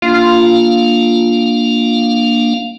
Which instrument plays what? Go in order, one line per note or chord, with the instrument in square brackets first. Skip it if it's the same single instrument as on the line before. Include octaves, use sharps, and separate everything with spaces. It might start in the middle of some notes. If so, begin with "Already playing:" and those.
[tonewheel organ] A#3 D4 F5 [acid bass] F4